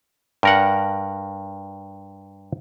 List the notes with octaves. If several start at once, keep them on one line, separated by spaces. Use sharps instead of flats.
G2 A#4 F#5